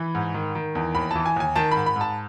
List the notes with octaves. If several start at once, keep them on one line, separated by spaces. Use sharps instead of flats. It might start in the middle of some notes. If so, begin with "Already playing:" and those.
Already playing: E3 B5
G#2
D#3
D#3
E2
D#2 B5
E3 A5
G#5
D#2 G#5
D#3 A5
G#2 B5
B5
G#2
A5